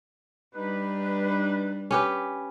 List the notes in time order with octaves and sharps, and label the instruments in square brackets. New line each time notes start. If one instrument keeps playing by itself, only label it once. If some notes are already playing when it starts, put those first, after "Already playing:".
[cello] G3 D4 [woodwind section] D#4 B4
[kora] C#4 G4 B4